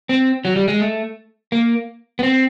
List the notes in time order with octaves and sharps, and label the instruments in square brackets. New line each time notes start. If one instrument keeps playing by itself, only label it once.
[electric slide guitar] C4
F#3
G3
G#3
A3
A#3
B3
C4